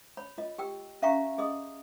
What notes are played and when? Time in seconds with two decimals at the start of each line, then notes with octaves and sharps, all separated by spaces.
0.17 C#5 B5
0.38 F4 D#5
0.58 G4 G5 E6
1.02 C#4 E5 F5 G5 A#5 C#6
1.38 G#4 D#5 C6 D#6